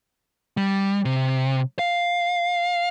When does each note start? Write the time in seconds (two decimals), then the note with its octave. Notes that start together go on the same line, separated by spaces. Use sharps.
0.57 G3
1.05 C3
1.79 F5